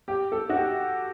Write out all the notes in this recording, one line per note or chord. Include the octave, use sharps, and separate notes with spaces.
G4
A4
F#4
G4